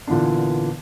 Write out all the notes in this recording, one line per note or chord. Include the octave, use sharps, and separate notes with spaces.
A#2 D3 E3 B3 D4